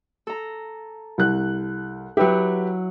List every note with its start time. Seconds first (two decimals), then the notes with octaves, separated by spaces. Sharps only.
0.27 A4 A#5
1.18 C2 F#6
2.17 F#3 E4 G4 B4